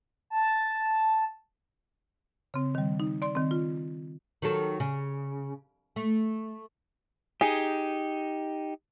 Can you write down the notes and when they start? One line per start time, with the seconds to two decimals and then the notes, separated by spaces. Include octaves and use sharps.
0.30 A5
2.54 C#3 C4
2.75 D#3 G3
3.00 D#4
3.22 D5 C6
3.35 D#3 C4
3.51 F4
4.42 D#3 F#3 A4
4.80 C#3
5.96 A3
7.41 D#4 G4 G#4